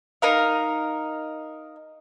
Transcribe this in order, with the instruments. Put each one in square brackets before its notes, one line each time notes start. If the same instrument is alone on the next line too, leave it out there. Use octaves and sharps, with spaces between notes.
[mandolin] D#4 A#4 F5